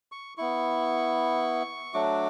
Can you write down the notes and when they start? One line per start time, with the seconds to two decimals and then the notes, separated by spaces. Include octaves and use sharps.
0.12 C#6
0.38 B3 E4 C#6
1.94 F#3 A3 D4 F#4 D6